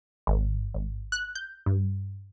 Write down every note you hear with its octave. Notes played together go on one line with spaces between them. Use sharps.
G#1
G#1
F#6
G6
G2